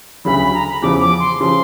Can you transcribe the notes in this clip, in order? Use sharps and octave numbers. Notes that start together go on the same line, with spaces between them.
D2 C#3 F#3 B5
B5
A#5
B5
E2 C#3 F3 D6
D6
C6
C#3 F3 C6